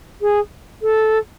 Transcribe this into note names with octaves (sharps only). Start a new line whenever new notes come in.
G#4
A4